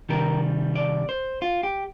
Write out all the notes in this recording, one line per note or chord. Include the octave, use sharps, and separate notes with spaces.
C3 D#3 G3 A#4
D5
C5
F4
G4